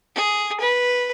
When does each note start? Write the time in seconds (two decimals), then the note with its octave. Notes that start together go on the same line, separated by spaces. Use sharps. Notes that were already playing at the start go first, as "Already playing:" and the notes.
0.15 G#4
0.60 B4